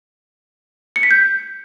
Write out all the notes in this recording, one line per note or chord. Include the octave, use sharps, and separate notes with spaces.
C#7
B6
G6